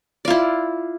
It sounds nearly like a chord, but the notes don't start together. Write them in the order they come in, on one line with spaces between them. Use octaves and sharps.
D5 F4 E4